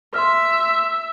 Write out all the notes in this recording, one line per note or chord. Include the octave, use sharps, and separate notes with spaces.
E5 C6 F6